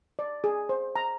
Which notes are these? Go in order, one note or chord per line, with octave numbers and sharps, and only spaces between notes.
D5
G#4
C5
A#5